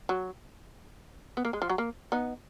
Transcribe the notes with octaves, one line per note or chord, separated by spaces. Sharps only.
F#3
B3
A#3
G#3
F3
F#3
A#3
B3 D#4